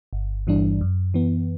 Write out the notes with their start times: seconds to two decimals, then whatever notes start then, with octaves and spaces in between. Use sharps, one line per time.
0.13 G1
0.47 G2 E3 G3 D4
0.81 F#2
1.14 E3 B3